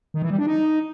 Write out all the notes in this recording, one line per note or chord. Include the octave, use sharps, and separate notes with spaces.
D#3
E3
G3
D4
D#4